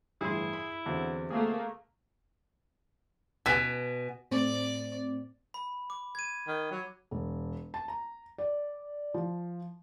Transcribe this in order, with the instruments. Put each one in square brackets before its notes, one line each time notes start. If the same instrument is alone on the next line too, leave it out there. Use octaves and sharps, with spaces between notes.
[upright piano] G1 A2 E3 [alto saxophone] E4 [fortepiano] G#4 C6
[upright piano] B5
[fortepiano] E2 [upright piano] D3 F#3 C4
[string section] A3 A#3 [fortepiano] G#4
[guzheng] B2 [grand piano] G#5 B6
[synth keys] A2 C4 [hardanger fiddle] D5 D6
[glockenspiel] B5
D6
G#6 D#7
[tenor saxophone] D#3
F#3
[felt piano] E1
A5
A#5
D5
F3